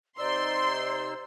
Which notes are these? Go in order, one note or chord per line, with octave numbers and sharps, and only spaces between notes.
C3 D#4 C5 D5 C6 E6